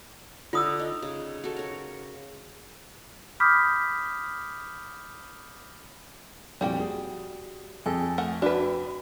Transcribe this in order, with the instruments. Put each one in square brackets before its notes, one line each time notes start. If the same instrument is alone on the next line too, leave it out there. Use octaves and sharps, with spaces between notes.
[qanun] D3 [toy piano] F4 D#6 E6
[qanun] D#4
C#3
F#4 A4
A#4 C#5
[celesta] B5 D6 D#6 F6 G6 B6
[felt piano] F2 A#2 [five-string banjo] G3 F#4 G5
[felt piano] G#4
[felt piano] F2 G#4 A4 [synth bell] G#5
[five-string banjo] A3 A#4 F#5
[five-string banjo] D4 B4 [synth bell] F#4